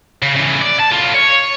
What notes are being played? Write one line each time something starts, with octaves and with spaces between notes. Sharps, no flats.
C#3
C#3 E3
D5
A5
A2 F4
C#5